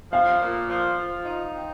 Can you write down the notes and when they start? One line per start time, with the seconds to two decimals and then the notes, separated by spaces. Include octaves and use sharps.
0.12 F3 F5
0.40 A#2
0.69 F3
0.97 F3
1.26 D#4
1.55 C4